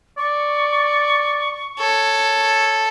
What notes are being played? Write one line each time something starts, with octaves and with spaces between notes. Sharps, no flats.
D5 C#6
A4 C#5